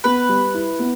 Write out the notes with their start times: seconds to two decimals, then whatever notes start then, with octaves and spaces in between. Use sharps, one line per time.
0.04 B3 B4
0.29 G3
0.54 E4
0.79 B3